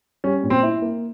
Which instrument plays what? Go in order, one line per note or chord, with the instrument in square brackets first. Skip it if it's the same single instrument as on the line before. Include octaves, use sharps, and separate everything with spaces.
[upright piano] G3 [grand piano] C#4
[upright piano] A#2
[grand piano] C4
[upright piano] E4
A#3